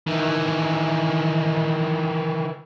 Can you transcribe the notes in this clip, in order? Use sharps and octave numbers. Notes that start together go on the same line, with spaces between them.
D#3 E3